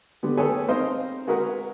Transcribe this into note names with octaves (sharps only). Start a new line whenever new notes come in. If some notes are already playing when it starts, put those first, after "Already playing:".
D3 G3 B3
G#4 A4 B4 C#5 G5 G#5
C4 D#4 C5 D#5 F5
G#3 F#4 G#4 A#4 B4 F#5